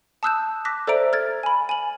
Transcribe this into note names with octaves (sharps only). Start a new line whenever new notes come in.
A5 D#6 E6 F#6 G6 E7
D6 F#6 A#6 B6
A4 C5 D5 E5 A#5 D7
F6 G#6 A6
G#5 B5
G#5 F#7